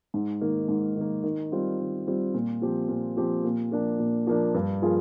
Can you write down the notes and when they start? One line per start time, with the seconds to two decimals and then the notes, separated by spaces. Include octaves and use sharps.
0.14 G#2
0.41 D#3 A#3
0.68 G#2
0.96 D#3 A#3
1.24 D#3
1.52 G3 C4 F4
1.79 D#3
2.07 G3 C4 F4
2.34 A#2
2.62 F3 C4 G4
2.89 A#2
3.17 F3 C4 G4
3.44 A#2
3.72 F3 A#3 D4
3.99 A#2
4.27 F3 A#3 D4
4.54 G2
4.82 F3 A#3 F4 G#4